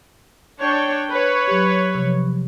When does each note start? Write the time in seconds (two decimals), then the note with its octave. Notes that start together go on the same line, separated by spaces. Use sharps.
0.59 D4 C#5 G5
1.11 B4 C#5
1.48 F#3 G4
1.95 C3 F3